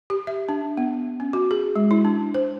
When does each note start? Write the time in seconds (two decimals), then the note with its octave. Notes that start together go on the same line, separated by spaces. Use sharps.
0.10 G4
0.27 E5
0.49 D4
0.77 B3
1.20 C#4
1.33 F#4
1.51 G#4
1.76 G#3
1.91 E4
2.05 D4
2.34 C5